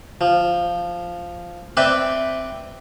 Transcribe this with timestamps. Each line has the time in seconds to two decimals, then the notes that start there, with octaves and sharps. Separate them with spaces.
0.21 F3
1.77 C4 B4 D5 E5 G5